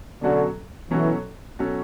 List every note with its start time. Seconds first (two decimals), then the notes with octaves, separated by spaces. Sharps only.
0.22 B2 D3 F#3 C#4 F#4 A4
0.90 B2 E3 F#3 C#4 F#4 A4
1.59 B2 F#3 C#4 F#4 A4